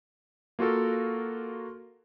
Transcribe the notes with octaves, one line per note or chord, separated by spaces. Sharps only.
A#3 F4 F#4 A4 A#4